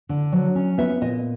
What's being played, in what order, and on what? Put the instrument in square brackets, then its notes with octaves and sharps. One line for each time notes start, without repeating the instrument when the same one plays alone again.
[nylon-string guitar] D3
F#3
C#4
B3 E5
A#2 D#5